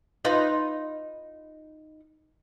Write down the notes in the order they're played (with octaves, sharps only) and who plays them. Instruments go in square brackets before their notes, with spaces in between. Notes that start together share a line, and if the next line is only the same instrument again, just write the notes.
[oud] D#4 F4 B4